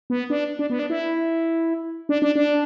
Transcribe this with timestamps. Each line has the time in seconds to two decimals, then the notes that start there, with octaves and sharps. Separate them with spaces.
0.10 B3
0.30 D4
0.59 D4
0.70 B3
0.79 D4
0.90 E4
2.09 D4
2.22 D4
2.36 D4